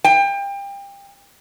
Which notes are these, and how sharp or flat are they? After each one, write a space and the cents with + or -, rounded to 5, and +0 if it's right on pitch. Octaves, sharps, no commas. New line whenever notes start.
G5 +30